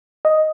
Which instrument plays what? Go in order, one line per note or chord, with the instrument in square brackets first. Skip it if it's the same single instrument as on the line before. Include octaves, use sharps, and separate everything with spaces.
[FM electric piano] D#5